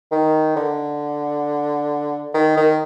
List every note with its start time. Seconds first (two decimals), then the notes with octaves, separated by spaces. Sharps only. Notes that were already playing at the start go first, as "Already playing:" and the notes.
0.12 D#3
0.56 D3
2.34 D#3
2.57 D#3